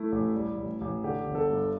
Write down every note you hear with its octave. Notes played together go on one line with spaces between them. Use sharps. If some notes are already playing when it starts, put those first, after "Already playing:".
Already playing: A3 E4
A1
G3
A1
A1
D3 G4
G1
A4
G2